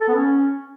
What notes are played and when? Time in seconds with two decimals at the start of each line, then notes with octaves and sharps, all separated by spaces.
0.01 A4
0.08 B3
0.15 C#4